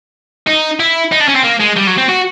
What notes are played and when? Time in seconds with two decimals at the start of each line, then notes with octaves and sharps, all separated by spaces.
0.47 D#4
0.80 E4
1.12 D#4
1.20 D4
1.28 C#4
1.35 C4
1.44 A#3
1.60 G#3
1.76 G3
1.87 F#3
1.98 C4
2.08 F#4